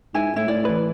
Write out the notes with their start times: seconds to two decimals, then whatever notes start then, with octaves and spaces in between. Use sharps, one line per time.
0.14 G#2 E4 G#5
0.36 A2 E4
0.48 A2 D5
0.65 E3 B4